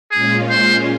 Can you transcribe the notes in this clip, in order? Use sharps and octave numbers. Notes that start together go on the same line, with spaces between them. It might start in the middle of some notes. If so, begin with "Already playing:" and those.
A#2 G#3 C#4 F4 G#4
C5